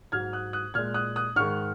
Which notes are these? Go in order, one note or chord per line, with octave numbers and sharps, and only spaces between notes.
G#2 F#3 F6 G#6
D#6 F#6
D#6 F#6
A#2 G#3 F6 G#6
D#6 F#6
D#6 F#6
G#2 D#3 G#3 C#6 F6